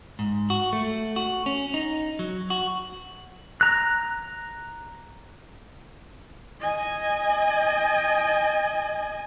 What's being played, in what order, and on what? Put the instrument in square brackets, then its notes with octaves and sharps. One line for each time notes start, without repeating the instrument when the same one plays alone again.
[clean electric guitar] G#2
F#4
A3
F#4
C#4
D#4
F#3
F#4
[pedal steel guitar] A#5 F#6
[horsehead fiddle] D#5 G#5